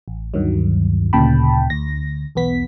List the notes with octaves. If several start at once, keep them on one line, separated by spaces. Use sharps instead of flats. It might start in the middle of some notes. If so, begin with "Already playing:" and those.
A1
D2 G2 D#3 F#3
D2 A#2 C#3 G5 A5 B5
D2 A#6
B1 E2 B3 B6